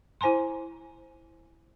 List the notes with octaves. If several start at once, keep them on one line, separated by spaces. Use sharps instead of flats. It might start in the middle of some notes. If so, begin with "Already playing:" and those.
E4 C5 G#5 A#5 C6